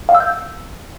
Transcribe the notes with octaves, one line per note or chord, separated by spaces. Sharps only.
F5
E6
G6